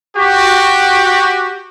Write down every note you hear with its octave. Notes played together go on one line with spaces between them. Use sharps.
F#4 G4